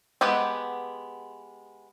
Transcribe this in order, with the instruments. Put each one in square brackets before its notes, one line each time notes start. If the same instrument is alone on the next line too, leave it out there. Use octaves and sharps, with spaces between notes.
[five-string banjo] G#3 B3 G4 B4 F#5